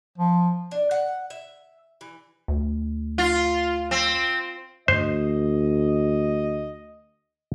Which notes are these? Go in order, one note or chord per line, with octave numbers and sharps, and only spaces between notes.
F3
D4
F#5
E5
E3
D2
F4
C4
D2 C5 D#5